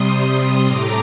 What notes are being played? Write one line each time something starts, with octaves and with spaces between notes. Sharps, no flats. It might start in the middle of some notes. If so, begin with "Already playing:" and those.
Already playing: C3 G3 C6 D#6
A2 A3 A#5 D6